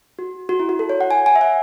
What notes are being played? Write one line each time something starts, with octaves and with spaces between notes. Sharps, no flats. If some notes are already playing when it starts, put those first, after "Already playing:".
F#4
F#4
E4
F#4
A4
C#5
F#5
G#5
G#5
E5
F#5